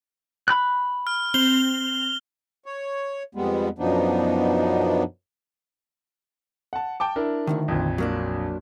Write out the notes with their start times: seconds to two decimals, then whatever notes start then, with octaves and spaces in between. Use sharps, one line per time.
0.48 B5 F#6
1.07 F6
1.34 C4 F7 G7
2.66 C#5
3.35 F2 G3 G#3 B3
3.78 F#2 B2 F3 B3 D4 D#4
6.73 F#5 A5
7.00 G5 A5 D6
7.16 D4 E4 A#4
7.47 D2 G#2 D#3
7.68 A#1 F2
7.98 F#3 A#3 D4